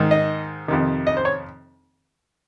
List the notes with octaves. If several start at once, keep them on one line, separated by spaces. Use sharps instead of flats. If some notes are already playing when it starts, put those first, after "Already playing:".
Already playing: G#2 D#3
D#5
F2 C3 D#3
D#5
C5
C#5